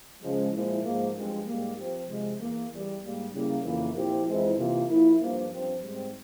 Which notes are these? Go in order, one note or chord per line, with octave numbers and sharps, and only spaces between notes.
C#3 F3 G#3
A#2 F3 G#3 E4
G#2 F3 A#3
G2 F3 G#3 C4
G#2 G3 A#3
F3 C4 G4
C3 F3 G#3
E2 E3 A#3
E2 E3 G3
G#2 G3 A#3
C#3 G3 A#3 E4
F2 C#3 E3 A#3
A#2 F3 C4 E4 G4
F2 E3 G#3 C4 E4
C3 E3 A#3 F4
F3 A#3 E4
G2 F3 A#3
G2 F3 C4
G#2 G3 C4